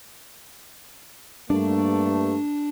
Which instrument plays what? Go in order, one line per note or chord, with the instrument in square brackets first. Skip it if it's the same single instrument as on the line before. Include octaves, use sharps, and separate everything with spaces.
[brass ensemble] G2 A3 A#3 [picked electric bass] D4